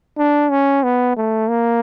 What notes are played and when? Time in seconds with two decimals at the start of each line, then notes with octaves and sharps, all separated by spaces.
0.18 D4
0.51 C#4
0.83 B3
1.16 A3
1.49 A#3